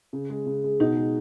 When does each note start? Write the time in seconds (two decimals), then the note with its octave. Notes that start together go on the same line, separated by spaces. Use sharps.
0.13 C#3
0.30 G#3
0.46 C#3
0.64 G#3
0.80 B2 D#4
0.97 G#3